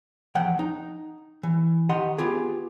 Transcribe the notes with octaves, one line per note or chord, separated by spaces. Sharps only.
E2 F3 F#5 G5
D#4
E3
D#3 G4 D#5 F#5 C6
B3 F4 G4 G#4